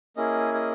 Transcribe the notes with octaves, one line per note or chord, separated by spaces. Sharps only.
A#3 C#4 E4 G#4 D#5
D#5